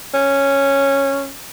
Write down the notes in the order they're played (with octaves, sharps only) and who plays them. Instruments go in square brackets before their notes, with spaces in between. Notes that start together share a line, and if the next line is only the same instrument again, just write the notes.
[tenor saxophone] C#4